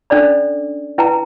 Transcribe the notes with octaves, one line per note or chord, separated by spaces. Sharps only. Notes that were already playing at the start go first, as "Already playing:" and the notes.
C#4 D4 A4 D5 B5
E4 B4 G5 A5 A#5